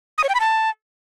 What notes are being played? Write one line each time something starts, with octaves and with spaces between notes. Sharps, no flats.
D#6
C#5
G5
B5
A5